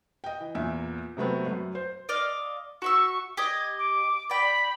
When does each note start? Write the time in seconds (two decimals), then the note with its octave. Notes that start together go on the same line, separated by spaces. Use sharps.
0.24 D#5 G5
0.40 E3
0.55 E2 A#2 E5
1.17 C3 F#3 A3 B3 C4
1.46 F#2
1.75 C5
2.09 D5 D#5 F5
2.82 F#4 E5 C#6 E6
3.37 G4 D#5 G#6
3.78 D6
4.30 D5 G5 B5